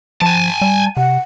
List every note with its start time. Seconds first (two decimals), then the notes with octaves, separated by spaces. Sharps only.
0.22 F3 G#5 A5
0.61 G3
0.97 C3 F#5